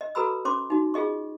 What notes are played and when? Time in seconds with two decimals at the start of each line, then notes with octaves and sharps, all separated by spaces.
0.01 D#5
0.15 F#4 A4 B4 A#5 B5 E6
0.45 C#4 C5 C6 D6
0.70 D#4 F#4
0.94 F4 G#4 D#5 C#6